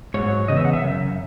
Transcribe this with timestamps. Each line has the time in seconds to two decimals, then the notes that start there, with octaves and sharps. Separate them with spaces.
0.14 G#2 F#3 C#5
0.48 E2 C#3 D#5
0.56 E5
0.65 F#5
0.73 E5
0.82 F#2 C#3